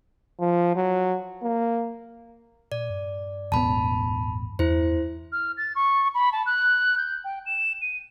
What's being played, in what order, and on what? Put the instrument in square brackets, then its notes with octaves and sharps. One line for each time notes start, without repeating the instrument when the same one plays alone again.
[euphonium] F3
F#3
A#3
[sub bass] A#2 [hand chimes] D5
[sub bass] G2
[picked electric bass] E1 A1 B3 [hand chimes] A5 B5
[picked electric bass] E2 [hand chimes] E4 C5
[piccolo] F6
A6
C#6
B5
A5
F#6
G6
G5
E7
D#7